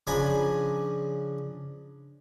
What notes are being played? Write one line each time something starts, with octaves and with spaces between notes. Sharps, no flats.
C#3 F3 D4 G#5 A#5 B5